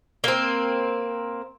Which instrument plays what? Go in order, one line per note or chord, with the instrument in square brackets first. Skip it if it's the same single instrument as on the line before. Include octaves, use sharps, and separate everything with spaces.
[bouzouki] A#3 C4